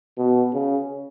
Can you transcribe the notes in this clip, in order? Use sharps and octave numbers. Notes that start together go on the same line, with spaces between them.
B2
C#3